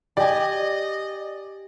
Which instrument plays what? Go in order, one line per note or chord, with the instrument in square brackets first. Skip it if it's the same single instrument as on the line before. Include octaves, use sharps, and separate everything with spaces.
[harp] G4 G#5 [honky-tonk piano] D5 [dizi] D#5